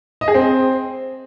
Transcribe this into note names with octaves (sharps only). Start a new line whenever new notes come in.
D#5
G#4
C4